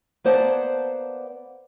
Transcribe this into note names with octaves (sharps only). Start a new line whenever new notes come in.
A#3 B3 C5 D5 F#5 A5